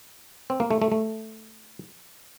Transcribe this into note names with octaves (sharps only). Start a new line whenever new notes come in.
C4
A#3
A3
A3
A3